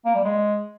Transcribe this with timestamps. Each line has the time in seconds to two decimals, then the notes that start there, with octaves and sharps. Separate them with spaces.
0.05 A#3
0.15 G3
0.24 G#3